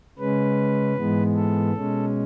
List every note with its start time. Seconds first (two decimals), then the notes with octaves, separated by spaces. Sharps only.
0.19 C#3 G#3 C#4 B4
0.96 G#2 E3 G#3 B3
1.35 A4
1.74 B2 G#3 C#4